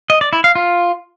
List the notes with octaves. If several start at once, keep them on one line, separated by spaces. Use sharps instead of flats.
D#5
D5
E4
F5
F4